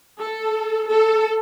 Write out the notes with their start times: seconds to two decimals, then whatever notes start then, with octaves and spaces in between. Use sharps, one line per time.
0.20 A4
0.89 A4